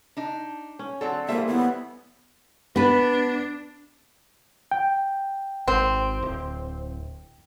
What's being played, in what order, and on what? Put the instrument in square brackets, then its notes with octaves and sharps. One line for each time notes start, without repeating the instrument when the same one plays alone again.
[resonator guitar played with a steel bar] D4 D#4
[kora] C#4
[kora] D3 [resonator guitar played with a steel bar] F#3 C4 A4
[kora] G3 A3 E4 [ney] A#3 [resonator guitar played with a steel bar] G#4 C5 E5
[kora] E3 E4 C#5 [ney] B3
[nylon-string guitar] B3 B4 [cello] D4
[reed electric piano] G5
[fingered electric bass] G#1 [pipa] C4
[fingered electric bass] D1